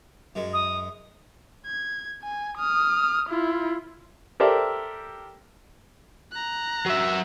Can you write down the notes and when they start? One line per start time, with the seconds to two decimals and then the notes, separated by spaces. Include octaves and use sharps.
0.35 F#2 G#3
0.53 D#6
1.66 G#6
2.23 G#5
2.58 D#6 F6
3.29 E4 F4
4.40 G4 A4 A#4 C5 D5 E5
6.32 A#5 F#6
6.86 F#3 E5